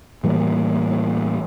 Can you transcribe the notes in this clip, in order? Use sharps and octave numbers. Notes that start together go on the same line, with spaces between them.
A2 E3 G3 A#3